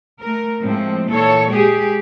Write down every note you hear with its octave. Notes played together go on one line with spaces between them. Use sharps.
A3 A#4
A2 F3 G#3 C4
A#2 E3 A4 C#5
G#3 G4 G#4